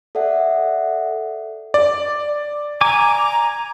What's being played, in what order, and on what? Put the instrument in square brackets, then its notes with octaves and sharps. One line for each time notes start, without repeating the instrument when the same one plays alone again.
[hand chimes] A4 D5 E5 F#5
[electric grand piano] D5
[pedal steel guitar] G#5 D6 [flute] A#5